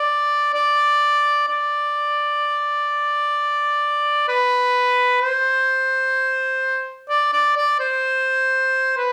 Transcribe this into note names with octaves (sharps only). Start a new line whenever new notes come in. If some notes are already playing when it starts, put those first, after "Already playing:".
Already playing: D5
D5
D5
B4
C5
D5
D5
D5
C5
B4